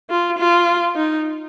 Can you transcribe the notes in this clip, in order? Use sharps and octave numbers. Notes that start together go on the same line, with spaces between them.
F4
F4
D#4